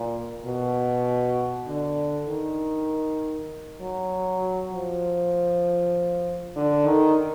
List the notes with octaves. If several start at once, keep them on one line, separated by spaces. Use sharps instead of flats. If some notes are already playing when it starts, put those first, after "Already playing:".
Already playing: A#2
B2
D3
D#3
F#3
F3
D3
D#3